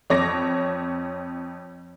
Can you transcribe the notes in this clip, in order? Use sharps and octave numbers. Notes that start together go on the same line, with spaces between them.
F2 C#5 D6 A#6